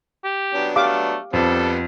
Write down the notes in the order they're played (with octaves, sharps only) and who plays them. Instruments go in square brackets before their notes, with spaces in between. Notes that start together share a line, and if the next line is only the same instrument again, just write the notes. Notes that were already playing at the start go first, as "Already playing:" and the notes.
[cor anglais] G4
[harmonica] F#3 B3 D4
[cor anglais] A3 [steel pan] G4 F5 D6
[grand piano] F2 [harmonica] G3 B3 C4 [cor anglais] A4